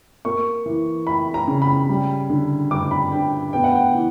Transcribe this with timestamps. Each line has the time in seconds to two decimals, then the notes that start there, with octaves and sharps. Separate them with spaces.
0.25 A#3 C#6
0.66 E3
1.07 E4 B5
1.34 A#5
1.48 C#3
1.62 B5
1.89 G3
2.30 D3
2.71 G2 D6
2.91 B5
3.12 G2 G5
3.53 B3 G5
3.64 F#5
3.75 G5
3.94 E3